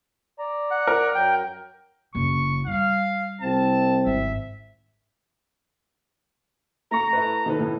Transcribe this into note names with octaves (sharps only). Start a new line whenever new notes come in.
D5 A#5
F#5
A#4
F#2 F#3 G5
F#1 C#3 C#6
G3 F5
C2 C4 A5
G#1 E5
A3 A#5 C#6
E4 A4 B4
D#3 D#4 A4 B4
A2